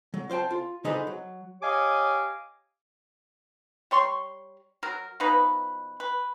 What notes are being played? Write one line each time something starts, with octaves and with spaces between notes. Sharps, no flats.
F#3
F4 C5 D5 G5 A5
F4
D3 D#4 G#4 A4 B4 C5
F#3
G4 C#5 D#5 F5 G#5 D6
G3 C#5 C6 C#6
F#3 A#4
B2 F3 D#4 B4
B4